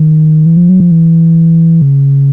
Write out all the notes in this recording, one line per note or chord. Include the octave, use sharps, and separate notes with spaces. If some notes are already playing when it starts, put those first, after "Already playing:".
Already playing: D#3
E3
F3
F#3
F3
E3
C#3